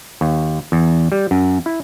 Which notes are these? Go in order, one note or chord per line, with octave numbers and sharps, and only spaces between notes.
D#2
E2
G3
F#2
E4